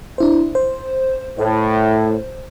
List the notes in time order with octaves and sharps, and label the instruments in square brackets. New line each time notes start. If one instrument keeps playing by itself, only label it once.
[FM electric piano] D4 E4 C5
C5
[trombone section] A2 [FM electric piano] C5